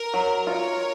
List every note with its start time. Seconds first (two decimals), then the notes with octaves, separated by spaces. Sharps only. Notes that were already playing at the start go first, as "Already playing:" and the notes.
Already playing: A#4
0.14 F#3
0.46 F4 A#4 C#5